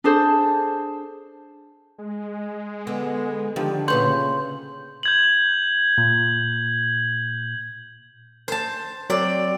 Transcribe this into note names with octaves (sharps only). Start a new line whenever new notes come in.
D4 G#4 A4 C5
G#3
D3 B3
D3 D#3 F3 G4
A#2 C#3 B4 C#5 C6 G6
G6 G#6 F#7
A#2
C5 A5
F#3 C4 D5